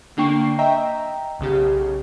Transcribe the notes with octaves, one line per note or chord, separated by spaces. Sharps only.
D3 A#3 D4 G5 C#6 C7
D#5 E5 G5 A#5
B1 C#3 G4